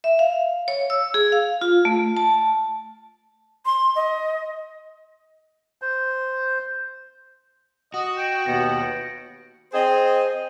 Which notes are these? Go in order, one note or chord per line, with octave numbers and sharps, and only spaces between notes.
E5
F5
C#5
E6
G#4
F5
F4
A3
A5
C6
D#5
C5
F#4 D#5
G5 A#6 D7 E7
D#2 B2 B3 A#6 C#7 E7
C4 G#4 C5 D#5